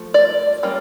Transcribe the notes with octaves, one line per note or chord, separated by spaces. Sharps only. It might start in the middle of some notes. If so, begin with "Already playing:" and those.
Already playing: F3 A3
D5
G3 A#3 C#4